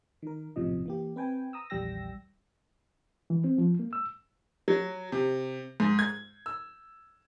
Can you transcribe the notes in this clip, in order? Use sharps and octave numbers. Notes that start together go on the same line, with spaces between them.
D#3 A#4
A#1 F#2 A2 C3 F3 D#5
E3 A#3 G4
C4 B4 G5 G#5
A#5 D#6 E6
A#1 E2 G3 G5 E6 A#6
E3
C4
F3
A#3
E6
F#3
C3
G#2
G#6
E6